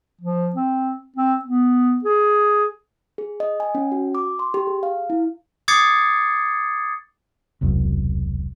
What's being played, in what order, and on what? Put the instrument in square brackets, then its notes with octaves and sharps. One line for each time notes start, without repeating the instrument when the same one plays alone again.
[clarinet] F3
C4
C4
B3
G#4
[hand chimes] G#4
D#5
G#5
C#4
F#4
D6
C6
G4
G#4
F5
E4
[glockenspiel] D6 D#6 G#6 A6 C7 C#7
[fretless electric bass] E1 C2 F#2